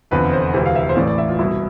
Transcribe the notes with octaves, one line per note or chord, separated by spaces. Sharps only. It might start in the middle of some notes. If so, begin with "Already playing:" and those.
F1 E2 D3 F3 B4
C5
E1 D2 C3 E3
F5
E5
C5
A1 A2 E3 D5
D5
E5
F4
C2 B2 E4